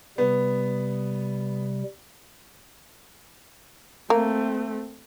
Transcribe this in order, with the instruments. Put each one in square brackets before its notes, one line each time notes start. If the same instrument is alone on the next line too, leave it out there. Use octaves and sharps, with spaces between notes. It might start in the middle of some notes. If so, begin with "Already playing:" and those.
[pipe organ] C3 G3 [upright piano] B3
[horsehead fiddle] A3 C4 [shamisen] A#3